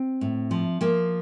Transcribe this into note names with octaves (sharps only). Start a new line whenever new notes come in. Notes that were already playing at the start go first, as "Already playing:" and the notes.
Already playing: C4
A2
F3
F3 A#3